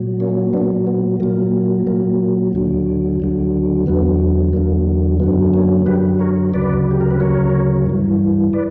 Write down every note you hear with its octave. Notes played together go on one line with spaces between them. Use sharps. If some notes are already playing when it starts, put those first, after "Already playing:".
Already playing: A#2 F#3
A#3 C#4
A#2 F#3 B3 D4
B3
A#2 F#3 A#3
A#2 F#3 A#3
D2 D3 F#3
D2 D3 F#3
E2 D3 F#3 B3
E2 D3 F#3 A#3
F#2 D3 F#3 B3
A#3 C#4
F#2 D3 F#3 G4 B4
A#4 C#5
D2 C#3 F#3 B4 D5
G4
A#4
B4
D2 C#3 F#3 A#4 C#5
G2 E3
B4 D5